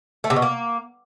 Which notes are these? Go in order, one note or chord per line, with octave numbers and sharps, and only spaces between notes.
A3
C3
B2
A#3